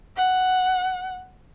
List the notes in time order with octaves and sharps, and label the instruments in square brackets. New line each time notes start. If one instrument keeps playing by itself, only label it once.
[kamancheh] F#5